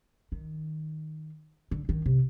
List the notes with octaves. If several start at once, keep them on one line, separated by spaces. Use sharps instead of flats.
D#3
D3
D#3
C3